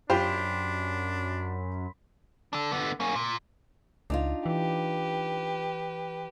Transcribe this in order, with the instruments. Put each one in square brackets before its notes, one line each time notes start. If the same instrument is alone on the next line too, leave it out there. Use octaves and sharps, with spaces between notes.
[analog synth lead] F#2 [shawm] D4 [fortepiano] F4 G4 C5 [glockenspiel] B5 C6 B6
[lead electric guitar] D4 A4
D3 B3
A#3 C#4
A#2
[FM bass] C#2 [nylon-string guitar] D4 D#4 F4
[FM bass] E3 [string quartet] G4 B4